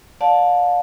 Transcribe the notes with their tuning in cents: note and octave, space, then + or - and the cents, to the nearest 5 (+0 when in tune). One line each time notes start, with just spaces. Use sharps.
D5 +0 F5 +35 A5 +0